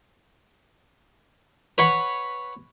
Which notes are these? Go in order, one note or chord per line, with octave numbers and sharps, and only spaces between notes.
B4 C#5 F#5 B5